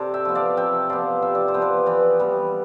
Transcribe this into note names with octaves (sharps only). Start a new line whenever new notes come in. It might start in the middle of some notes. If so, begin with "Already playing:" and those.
Already playing: C3 A4 C5 D5
E5 G5
F3 B3
D5 F5
C3 E5 G5
F3 B3 D5 F5
C3 E5
D5
C5
F3 B3
B4 D5
E3 B4 D5
G3 B3